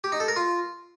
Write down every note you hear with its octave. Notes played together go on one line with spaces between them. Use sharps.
G4
D#4
A4
A#4
F4